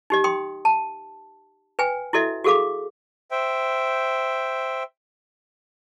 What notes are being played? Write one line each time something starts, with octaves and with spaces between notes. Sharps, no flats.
D#4 G4 D#5
G5 C6 D#6
A5
B4 G5 G#5
E4 F#4 A4 D#5 E5
F#4 G#4 A4 F5 D6
C5 E5 G5